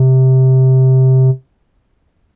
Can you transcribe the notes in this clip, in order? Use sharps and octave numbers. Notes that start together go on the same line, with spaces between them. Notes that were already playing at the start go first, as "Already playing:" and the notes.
Already playing: C3